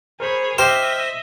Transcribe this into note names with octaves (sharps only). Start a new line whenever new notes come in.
G#4 A#4 C5 C#5 B5
G4 C5 D#5 E5 C6 F6